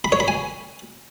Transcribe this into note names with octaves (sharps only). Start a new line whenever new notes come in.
B5
C#5
B5
G#5